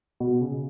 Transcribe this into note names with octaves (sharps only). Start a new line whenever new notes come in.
B2
C#3